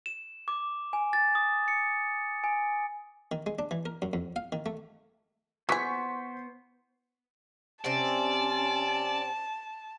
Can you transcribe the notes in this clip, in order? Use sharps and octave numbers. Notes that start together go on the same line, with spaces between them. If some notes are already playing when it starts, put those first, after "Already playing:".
E7
D6
G#5
A6
D#6
C#7
G#5
D#3
G#3
D4
E3
A#4
F#2
F2
F5
D#3
A3
E3 B3 G#4 C5 C#6 B6
C3 C4 C#4 D5 A5